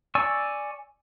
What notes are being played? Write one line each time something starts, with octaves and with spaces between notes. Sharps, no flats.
D5 G#5 C#6 E6